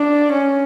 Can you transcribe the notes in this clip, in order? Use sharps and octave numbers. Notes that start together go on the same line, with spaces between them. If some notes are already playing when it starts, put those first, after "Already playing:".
Already playing: D4
C#4